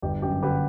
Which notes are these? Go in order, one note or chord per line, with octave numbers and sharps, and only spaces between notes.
G1 G4
F#2 G4
D3 G4 B4